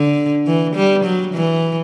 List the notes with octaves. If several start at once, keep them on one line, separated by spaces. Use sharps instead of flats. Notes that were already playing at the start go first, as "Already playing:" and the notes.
Already playing: D3
E3
G3
F#3
E3